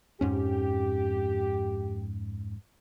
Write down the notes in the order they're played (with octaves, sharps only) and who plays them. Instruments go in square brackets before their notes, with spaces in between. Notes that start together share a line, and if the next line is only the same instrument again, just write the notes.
[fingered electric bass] F2 G#2 C#4 [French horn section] G4